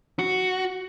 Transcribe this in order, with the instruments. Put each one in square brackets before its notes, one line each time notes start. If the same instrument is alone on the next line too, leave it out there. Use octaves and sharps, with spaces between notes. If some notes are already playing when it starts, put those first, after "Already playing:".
[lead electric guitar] F#4